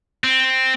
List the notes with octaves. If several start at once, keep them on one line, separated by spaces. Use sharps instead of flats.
C4